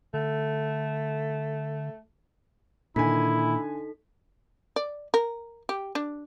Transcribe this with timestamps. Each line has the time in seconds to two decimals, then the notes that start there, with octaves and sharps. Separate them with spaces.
0.14 D3 A3
2.96 A#2 D3 D#3 D#4 E4 A4 G#5 B6
4.76 D5
5.14 A#4
5.69 G4
5.95 D4